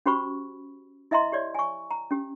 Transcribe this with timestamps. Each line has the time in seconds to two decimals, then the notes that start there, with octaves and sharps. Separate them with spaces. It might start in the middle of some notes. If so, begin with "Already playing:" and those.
0.06 C#4 F#4 G4 C5 B5 C#6
1.11 E4 D#5 E5 A#5 C6
1.32 G4 C#5 D5
1.54 G#5 C#6
1.91 A#5
2.11 C#4 G4